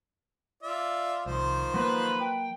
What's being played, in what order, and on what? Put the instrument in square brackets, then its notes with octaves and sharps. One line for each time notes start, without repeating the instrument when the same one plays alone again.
[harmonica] F4 D5 E5
[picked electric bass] C2 [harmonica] D#3 F3 C5
[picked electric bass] F#3 A#3 [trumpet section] B4
[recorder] G5